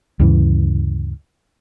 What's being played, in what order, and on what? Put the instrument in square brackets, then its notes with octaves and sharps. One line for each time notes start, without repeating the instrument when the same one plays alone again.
[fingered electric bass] D2 G2 C#3 E3